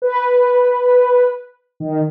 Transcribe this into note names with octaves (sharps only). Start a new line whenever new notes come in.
B4
D#3